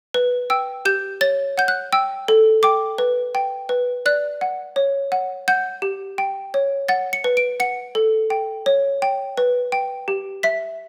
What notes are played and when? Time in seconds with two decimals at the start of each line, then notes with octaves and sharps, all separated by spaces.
0.14 B4
0.50 G5 E6
0.85 G4 G6
1.21 C#5 A6
1.58 F#5 G6
1.68 F#6
1.92 G5 E6
2.28 A4
2.63 G5 D6
2.98 B4
3.35 G5
3.69 B4
4.06 D5 F#6
4.41 F#5
4.76 C#5
5.12 F#5
5.48 F#5 G6
5.82 G4
6.18 G5
6.54 C#5
6.88 F#5 A6
7.13 C#7
7.24 B4
7.37 D7
7.60 F#5 C#7
7.95 A4
8.30 G5
8.66 C#5
9.02 G5
9.37 B4
9.72 G5
10.08 G4
10.43 E5 B6